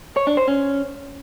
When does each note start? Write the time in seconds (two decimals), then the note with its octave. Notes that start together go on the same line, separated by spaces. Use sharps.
0.17 C#5
0.27 D4
0.37 C5
0.48 C#4